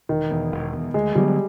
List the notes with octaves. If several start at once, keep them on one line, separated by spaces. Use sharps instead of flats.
E1 D#3
E2 B2
E1
E2 B2
D2 G#3
D3 F#3 G3 B3